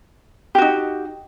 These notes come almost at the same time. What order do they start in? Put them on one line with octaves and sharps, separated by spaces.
G4 F#4 D#4